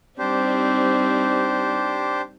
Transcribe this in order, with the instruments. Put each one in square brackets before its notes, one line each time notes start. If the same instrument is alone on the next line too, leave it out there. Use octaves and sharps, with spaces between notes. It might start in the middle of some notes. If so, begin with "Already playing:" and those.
[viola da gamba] G3 C4 D#4 [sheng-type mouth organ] D4 G4 C5